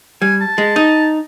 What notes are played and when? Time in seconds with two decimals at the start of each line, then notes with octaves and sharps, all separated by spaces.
0.22 G3 G#5
0.41 A5
0.58 G#3
0.76 D#4